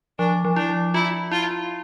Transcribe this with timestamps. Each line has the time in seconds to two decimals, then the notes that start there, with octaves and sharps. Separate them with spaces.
0.19 F3 D4
0.45 F3
0.56 D4 E4
0.94 E4 F4
1.31 E4 F4